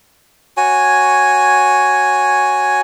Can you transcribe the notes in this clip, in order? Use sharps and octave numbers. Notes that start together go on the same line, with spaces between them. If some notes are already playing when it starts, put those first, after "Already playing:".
F#4 C#5 G#5